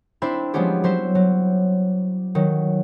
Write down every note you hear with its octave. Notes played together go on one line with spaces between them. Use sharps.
C4 D4 E4 C5 E5 B5
F3 G3 G#3 B3 C#4 G4
F#3 C5 E5
F#3
D#3 F#3